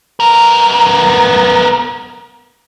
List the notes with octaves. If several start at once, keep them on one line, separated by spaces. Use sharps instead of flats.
B3 A#4